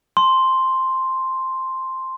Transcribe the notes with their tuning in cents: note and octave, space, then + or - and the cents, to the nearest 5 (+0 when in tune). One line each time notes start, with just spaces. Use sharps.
A5 +0 C6 +0